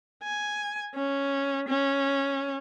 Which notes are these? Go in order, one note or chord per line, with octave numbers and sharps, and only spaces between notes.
G#5
C#4
C#4